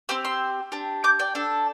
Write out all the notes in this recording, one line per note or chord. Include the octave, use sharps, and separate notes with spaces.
C4 G4 C6 E6
C6 E6
D4 G4
D6 G6
D5 G5
D4 A4